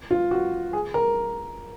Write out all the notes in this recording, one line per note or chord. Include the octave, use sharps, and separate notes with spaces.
F4
F#4
G#4
A#4